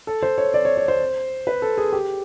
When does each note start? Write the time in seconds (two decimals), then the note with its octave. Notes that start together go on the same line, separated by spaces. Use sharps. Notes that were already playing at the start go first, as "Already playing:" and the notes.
0.07 A4
0.23 C5
0.38 C#5
0.54 D5
0.65 C#5
0.77 C#5
0.88 C5
1.47 B4
1.62 A4
1.78 G#4
1.93 G4